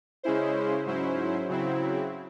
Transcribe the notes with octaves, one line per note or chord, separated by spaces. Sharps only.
C#3 G#3 C#4 E4 C5
G#2 F#3 C#4 E4 C5
C#3 F#3 C4 E4